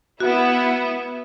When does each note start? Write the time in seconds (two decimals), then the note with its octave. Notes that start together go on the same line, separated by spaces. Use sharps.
0.20 B3 E4 F#4